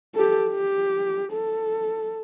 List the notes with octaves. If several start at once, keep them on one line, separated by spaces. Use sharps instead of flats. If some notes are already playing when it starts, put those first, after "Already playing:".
G4 A4
G4
A4